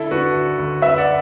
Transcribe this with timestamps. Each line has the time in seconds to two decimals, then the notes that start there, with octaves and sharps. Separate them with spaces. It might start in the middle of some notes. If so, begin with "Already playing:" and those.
Already playing: D3 E4 A4
0.11 D3 F#4 B4
0.35 D2
0.58 D2
0.82 F#2 B4 E5
0.98 D5 F#5